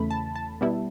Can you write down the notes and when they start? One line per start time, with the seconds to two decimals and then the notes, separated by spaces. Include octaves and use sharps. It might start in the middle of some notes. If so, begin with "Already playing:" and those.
Already playing: E2 C#3 E3 A3 B5
0.11 A5
0.36 A5
0.61 B2 G3 B3 E4